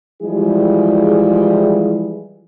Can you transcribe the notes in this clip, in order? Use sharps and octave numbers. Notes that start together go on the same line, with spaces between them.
E3 F3 G3 G#3 E4 G#4